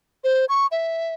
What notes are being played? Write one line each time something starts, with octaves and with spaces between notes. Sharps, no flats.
C5
C#6
E5